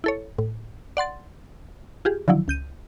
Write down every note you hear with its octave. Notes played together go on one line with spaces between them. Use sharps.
E4 A4 C#5
A2
D5 F#5 C6 A6
F4 G4 G#4
D3 D#3 F3 F#3 E4
C#2 G6 D#7